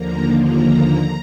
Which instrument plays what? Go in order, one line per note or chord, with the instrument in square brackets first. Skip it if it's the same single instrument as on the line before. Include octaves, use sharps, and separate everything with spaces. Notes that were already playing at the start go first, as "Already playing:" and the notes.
Already playing: [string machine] D#2 D3 F3 A#3 A#5
A#5